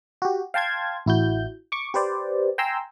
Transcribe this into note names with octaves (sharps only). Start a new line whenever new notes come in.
F#4 G4
F5 G5 A5 C6 G#6
A1 E4 F#4 G6
C#6 D6
G4 B4 C5 D5
G5 G#5 A#5 C6 E6 G6